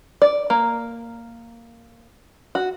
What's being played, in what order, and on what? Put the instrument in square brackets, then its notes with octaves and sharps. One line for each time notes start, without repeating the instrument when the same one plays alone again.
[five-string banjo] D5
A#3
F#4